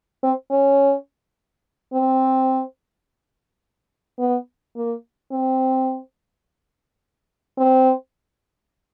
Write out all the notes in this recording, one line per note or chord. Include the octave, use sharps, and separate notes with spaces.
C4
C#4
C4
B3
A#3
C4
C4